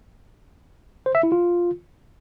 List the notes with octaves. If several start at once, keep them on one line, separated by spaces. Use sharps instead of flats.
C5
E5
E4
F4